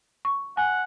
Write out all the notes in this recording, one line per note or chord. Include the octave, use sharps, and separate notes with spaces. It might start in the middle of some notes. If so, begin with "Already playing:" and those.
C#6
F#5 G#5